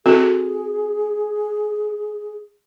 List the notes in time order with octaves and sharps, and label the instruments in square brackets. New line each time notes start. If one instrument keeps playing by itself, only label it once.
[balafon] C4 F#4 A4 [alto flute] G#4